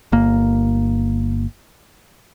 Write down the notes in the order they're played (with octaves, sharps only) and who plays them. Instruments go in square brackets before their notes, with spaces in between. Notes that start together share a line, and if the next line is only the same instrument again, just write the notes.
[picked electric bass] G1 A#3